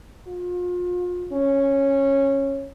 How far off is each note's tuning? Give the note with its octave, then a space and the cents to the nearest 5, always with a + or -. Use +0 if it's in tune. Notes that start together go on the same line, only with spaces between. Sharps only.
F4 +35
C#4 -10